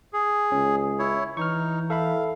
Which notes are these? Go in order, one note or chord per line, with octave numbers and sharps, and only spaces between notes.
G#4
C#2 C#4
E4 C#5
E3 D#4 C#6 F6
A4 E5 F5 B5